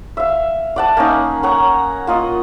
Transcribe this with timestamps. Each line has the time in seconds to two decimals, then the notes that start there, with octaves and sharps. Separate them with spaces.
0.17 E5 F5
0.76 D5 F#5 A5
0.97 A#3 C#4 D#4
1.43 C#5 F#5 A#5
2.07 A#3 F4 D#5 F#5